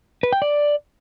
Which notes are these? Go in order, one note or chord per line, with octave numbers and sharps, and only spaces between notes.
B4
G5
D5